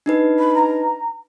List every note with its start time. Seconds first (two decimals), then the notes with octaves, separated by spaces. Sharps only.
0.06 D4 D#4 B4
0.39 B5
0.55 A#5